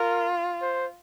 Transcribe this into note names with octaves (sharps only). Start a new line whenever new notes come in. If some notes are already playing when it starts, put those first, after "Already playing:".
Already playing: F4 A#4
C5